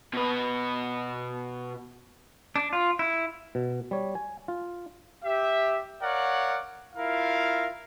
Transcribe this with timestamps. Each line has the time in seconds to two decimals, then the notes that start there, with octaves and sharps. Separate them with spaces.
0.13 B2 B4
2.56 D4
2.73 F4
2.99 E4
3.55 B2
3.91 G3 C#5
4.15 G#5
4.48 F4
5.23 G4 E5
6.02 A#4 C#5 D5 F5 F#5
6.96 E4 F4 A#4 E5 F5